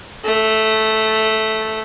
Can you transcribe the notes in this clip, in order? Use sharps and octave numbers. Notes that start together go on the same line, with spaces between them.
A3